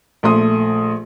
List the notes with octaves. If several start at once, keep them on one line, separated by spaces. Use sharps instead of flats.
A#1 A3 C6 D#6